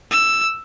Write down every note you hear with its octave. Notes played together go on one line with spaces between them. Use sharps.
E6